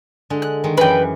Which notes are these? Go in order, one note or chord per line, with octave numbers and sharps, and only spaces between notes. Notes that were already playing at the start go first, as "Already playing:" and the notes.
D3 G#3
F#6
D#3 G#3
F#2 E3 B4 G5